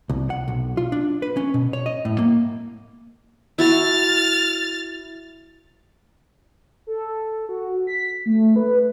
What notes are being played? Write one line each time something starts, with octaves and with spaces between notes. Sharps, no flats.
C2
F#5
B1
F4
D4
B4
C#4
B2
C#5
D#5
A2
A#3
E4 F#4 A5 F6 A6
A4
F#4
B6
A3
B4